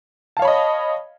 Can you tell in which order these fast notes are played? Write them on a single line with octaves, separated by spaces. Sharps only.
A5 F5 C#5 B5 D#5